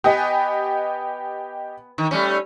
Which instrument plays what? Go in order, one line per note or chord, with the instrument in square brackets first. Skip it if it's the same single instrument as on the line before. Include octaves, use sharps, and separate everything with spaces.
[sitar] B3 [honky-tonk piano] G4 D#5 G#5
[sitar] D#3
G3 A3 C#4